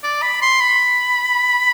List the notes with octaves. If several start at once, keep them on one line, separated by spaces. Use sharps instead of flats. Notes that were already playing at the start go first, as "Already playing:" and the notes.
D5
B5
C6
B5